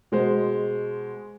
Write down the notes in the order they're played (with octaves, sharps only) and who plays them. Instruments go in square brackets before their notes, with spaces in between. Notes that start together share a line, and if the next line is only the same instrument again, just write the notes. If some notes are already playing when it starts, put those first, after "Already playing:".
[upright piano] B2 G#3 C5